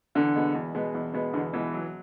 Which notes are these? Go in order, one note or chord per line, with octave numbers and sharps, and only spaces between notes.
E2 D3
B2 G#3 B3
E2
B2 G#3 B3
E2
B2 G#3 B3
E2 D3
B2 E3 G#3 B3
F#3